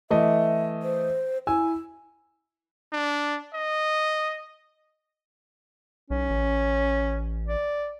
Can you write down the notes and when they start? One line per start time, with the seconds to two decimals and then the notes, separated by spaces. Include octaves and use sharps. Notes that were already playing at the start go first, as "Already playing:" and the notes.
0.11 E3 A3 D#5 E5
0.83 C5
1.47 E4 G#5 E6
2.93 D4
3.54 D#5
6.10 B1 C#4
6.30 A1
7.48 D5